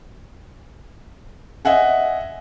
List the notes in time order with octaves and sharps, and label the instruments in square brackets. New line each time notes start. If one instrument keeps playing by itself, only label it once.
[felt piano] D#5 E5 F#5 G#5